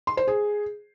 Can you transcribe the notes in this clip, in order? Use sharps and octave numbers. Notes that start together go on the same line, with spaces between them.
C6
C5
G#4